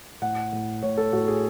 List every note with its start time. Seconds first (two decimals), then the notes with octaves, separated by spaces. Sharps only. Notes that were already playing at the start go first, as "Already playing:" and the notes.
0.22 A2 F#5
0.53 A2
0.83 A2 C#5
0.97 A4
1.13 A2 F#4
1.28 G#4